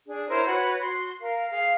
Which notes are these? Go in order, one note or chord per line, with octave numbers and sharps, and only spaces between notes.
D4 G#4
E4 A#4 C5 C#5
F#4 B4 C#5 F#5
F#4 C6
A#4 F5
G#4 F5